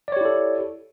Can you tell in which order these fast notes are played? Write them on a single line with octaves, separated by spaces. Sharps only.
D5 C#5 G4 E4 A4